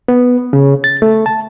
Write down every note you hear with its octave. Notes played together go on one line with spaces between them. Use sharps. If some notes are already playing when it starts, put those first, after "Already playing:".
B3
C#3
A6
A3
A5